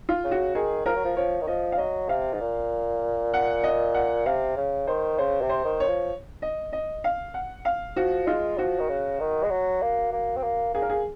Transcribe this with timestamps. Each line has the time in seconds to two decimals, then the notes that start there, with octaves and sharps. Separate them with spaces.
0.09 F4
0.24 C#3
0.31 F#4
0.55 D#3 G#4
0.86 F3 A#4
0.95 F#3
1.05 F3
1.17 F3 C#5
1.41 D#3
1.47 F3 D#5
1.72 F5
1.78 F#3 D#5
2.09 C3 F5
2.33 G#2
2.40 A#2
3.34 F#5
3.64 D#5
3.94 F#5
4.26 C3 F5
4.57 C#3
4.87 D#3 C5
5.18 C#3 C5
5.41 C3
5.49 C5
5.65 D#3
5.80 C#5
5.88 F3
6.42 D#5
6.73 D#5
7.04 F5
7.34 F#5
7.65 F5
7.96 F3 F#4
8.27 G#3 F4
8.58 F3 F#4
8.80 D#3
8.89 C#3
9.20 D#3
9.43 G#3
9.50 F#3
9.82 A#3
10.13 A#3
10.36 C4
10.43 A#3
10.74 A#3 G#4
10.82 A#4
10.90 G#4